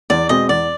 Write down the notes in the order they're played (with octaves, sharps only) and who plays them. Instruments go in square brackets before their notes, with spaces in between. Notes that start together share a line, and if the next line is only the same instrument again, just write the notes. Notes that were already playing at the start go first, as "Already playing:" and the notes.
[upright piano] E2 [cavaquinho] D5
[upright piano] B2 G#3 C4 [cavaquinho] D#5
[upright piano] E2 [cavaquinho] D5